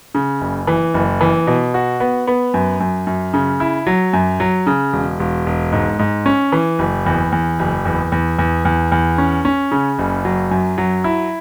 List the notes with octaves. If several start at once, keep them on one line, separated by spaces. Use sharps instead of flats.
C#3
F#1
E3
F#1
E3
B2
F#4
B3
B3
F#2
F#2
F#2
C#3
E4
F#3
F#2
F#3
C#3
E1
E1
E1
G#2
G#2
C#4
E3
F#1
E2
E2
F#1
E2
E2
E2
E2
E2
C#4
C#4
C#3
F#1
F#3
F#2
F#3
E4